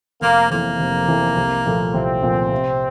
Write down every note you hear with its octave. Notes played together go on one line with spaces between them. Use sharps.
F1 A#3
F2 E3 A#3
F1
F2 E3
C2
A#2 F3 A3
C2 C4
A#2 F3 A3
C3